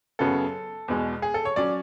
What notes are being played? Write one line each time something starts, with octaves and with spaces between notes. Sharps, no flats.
F#2 C#3 F#3 B3 A4
E2 B2 G#3
G#4
A4
C#5
F#3 C#4 D5